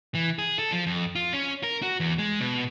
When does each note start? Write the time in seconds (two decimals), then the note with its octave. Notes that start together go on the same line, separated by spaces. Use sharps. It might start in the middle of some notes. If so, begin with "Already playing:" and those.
0.15 E3
0.39 G#4
0.59 A4
0.72 F3
0.86 F2
1.15 F4
1.34 C#4
1.63 A#4
1.82 F#4
2.00 E2
2.18 G#3
2.40 B2